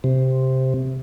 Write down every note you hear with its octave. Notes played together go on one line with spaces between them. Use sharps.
C3